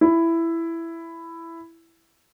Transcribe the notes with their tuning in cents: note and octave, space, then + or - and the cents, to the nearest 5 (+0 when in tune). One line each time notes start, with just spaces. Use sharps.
E4 +10